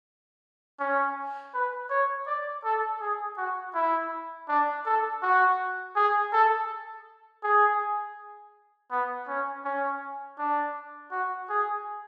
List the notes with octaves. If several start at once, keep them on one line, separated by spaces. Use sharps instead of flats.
C#4
B4
C#5
D5
A4
G#4
F#4
E4
D4
A4
F#4
G#4
A4
G#4
B3
C#4
C#4
D4
F#4
G#4